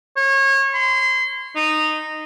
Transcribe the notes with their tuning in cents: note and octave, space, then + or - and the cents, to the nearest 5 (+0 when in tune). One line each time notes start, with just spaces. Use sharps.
C#5 -30
C6 -30
D#4 -15